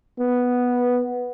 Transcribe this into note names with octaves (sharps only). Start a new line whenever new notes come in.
B3